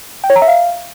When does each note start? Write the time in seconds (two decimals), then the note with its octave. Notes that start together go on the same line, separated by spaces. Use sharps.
0.24 G5
0.30 C#5
0.36 A#5
0.42 E5
0.48 F5